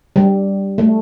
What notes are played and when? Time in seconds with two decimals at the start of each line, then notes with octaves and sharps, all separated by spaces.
0.16 G3
0.78 A3